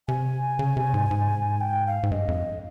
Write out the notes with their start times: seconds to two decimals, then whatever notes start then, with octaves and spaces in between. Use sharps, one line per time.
0.08 C3 G#5
0.59 C#3
0.77 C3
0.94 G#2
1.11 G#2
1.61 G5
1.87 F5
2.03 G#2
2.11 G2 D#5
2.28 F2